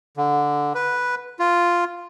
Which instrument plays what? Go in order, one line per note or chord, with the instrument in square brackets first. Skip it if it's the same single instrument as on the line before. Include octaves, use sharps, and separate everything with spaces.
[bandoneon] D3
B4
F4